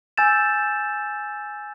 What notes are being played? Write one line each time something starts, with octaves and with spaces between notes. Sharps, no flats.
G#5 E6 G6 A6 E7